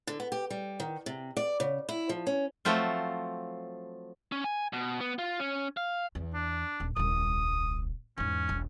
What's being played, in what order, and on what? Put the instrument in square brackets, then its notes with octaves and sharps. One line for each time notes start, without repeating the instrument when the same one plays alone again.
[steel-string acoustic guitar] D3
B3
G4
G3
D#3
C3
D5
C#3
E4
F3
C#4
[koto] F3 F#3 A3 C4 F4
[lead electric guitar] C#4
G#5
B2
B3
F4
C#4
F5
[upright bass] E2
[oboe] D4
[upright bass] D#1
[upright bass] D#1 C2 [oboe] D#6
[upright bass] E2 G#2 [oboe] C#4
[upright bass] E1 B1